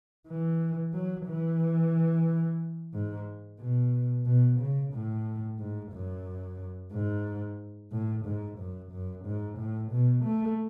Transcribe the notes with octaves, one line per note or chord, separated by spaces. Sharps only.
E3
F#3
E3
G#2
B2
B2
C#3
A2
G#2
F#2
G#2
A2
G#2
F#2
F#2
G#2
A2
B2
A3